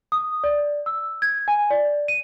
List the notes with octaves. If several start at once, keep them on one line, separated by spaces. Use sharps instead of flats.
D#6
D5
E6
G#6
G#5
D5
D#7